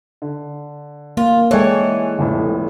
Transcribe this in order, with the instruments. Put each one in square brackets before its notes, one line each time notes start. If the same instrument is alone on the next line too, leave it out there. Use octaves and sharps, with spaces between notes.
[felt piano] D3
[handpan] A#3 [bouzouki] F4
[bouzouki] E3 [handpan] G#3 C#5 [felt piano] A4 D5 G5
[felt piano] F1 F2 A2